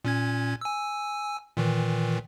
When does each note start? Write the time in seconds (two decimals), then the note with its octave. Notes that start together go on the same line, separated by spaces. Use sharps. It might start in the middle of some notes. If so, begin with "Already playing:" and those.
0.05 A#2 C#4 G#6
0.61 G#5 E6
1.57 A#2 D#3 E3